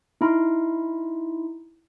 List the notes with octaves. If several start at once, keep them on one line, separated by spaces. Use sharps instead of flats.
D#4 E4 A#5 C6